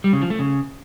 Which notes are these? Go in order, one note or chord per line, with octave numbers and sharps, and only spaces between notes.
G3
C#3
F3
A3
C#3